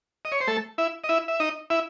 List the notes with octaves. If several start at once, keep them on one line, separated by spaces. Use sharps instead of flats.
D#5
C#5
C5
A3 A4
E4 E5
D#5
E4 E5
E5
D#4 D#5
E4 E5